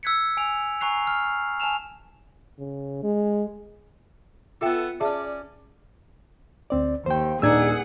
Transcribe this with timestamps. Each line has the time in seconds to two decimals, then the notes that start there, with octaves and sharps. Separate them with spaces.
0.03 E6 F#6 G#6 B6 C#7
0.37 G#5 D7 F7
0.81 G#5 A#5 C#6 F#6 C7 F7
1.07 F6
1.60 G#5 A5 F6 E7 F7
2.59 C#3
3.03 G#3
4.61 B3 F4 A4 E5 G5
5.01 C#4 G#4 D5 E5 A5
6.70 D2 C4 D5
7.06 D#2 C5 G5
7.42 D#1 D4 D#4 G#4 F#5 E6 G#6